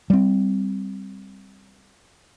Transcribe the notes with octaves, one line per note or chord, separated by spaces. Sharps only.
G3 C4